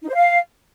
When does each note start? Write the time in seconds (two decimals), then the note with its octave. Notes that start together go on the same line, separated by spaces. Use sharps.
0.03 D#4
0.09 C5
0.14 F5